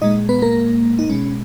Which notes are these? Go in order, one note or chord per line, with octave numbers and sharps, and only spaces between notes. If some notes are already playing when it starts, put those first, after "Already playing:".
A#2 G#3 D#4 D#5
B3 B4
A#3 A#4
D#4
B2 G#3 C#4